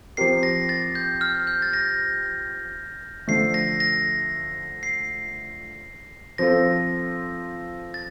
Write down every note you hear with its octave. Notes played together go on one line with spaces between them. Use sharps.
F3 C4 G4 A#4 C7
A#6
A6
G6
F6
G6
A6
A#6
D3 F3 A3 C7
A#6
A#6
C7
F3 C4 F4 A4 A#6
A6